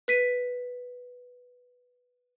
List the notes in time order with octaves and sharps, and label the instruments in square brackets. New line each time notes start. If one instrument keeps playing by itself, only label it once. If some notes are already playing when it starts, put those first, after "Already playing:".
[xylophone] B4 B6 D#7